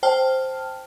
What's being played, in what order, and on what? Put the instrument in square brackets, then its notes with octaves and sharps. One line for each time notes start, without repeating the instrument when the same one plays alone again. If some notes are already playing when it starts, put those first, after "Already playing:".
[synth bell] C5 G5 A5 F6